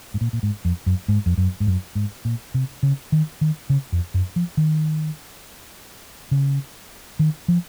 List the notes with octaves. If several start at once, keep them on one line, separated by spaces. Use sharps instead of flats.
G#2
A#2
A#2
G#2
F2
F#2
G#2
F2
F#2
G#2
F#2
G#2
A#2
C3
C#3
D#3
D#3
C#3
F2
F#2
F3
D#3
C#3
D#3
F3